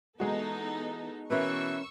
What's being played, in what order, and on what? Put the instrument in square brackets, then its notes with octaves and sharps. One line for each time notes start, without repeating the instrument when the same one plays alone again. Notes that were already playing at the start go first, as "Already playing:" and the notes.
[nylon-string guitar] E3 [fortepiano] G#3 F#4 [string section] B3 D#4 A4
[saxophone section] B2 E3 [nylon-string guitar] C#4 A#4 B4 [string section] C#6 E6